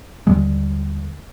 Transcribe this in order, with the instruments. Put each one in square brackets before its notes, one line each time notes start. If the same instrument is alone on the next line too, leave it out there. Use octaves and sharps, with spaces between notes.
[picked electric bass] D#2 D3 G3 G#3